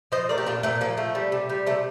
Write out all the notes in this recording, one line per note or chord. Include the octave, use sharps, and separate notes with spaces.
F3 C5 D#5
A3 A#4 D5
G4
A#2 D4 F4
A#2 A3 C4
F3 A#3
A3
G3
C3
G3
C3 A3